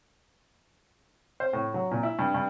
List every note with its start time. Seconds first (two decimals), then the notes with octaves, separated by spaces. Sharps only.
1.40 C5
1.53 A2
1.74 F#3
1.91 A#2
2.03 E4
2.19 G2
2.34 G2